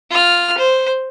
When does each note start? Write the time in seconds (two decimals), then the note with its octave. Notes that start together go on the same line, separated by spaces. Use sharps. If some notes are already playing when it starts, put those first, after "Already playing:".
0.10 F4 F6
0.58 C5